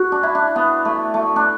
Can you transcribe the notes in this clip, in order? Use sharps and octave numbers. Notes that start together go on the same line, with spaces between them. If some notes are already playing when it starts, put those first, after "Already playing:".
Already playing: F#4
D4
E4
D4
B3
A3
A3
D4